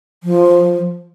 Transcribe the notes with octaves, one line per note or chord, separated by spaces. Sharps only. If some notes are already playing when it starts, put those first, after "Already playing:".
F3